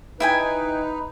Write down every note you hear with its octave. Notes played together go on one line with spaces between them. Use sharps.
D#4 E4 B4 G5 G#5